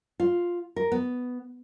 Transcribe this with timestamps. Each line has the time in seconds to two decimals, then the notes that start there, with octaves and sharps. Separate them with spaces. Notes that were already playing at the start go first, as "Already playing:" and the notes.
0.20 F4
0.76 A#4
0.92 B3